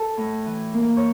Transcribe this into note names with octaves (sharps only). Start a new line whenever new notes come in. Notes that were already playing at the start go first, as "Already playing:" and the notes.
Already playing: A4
A2
E3
A#3
C#5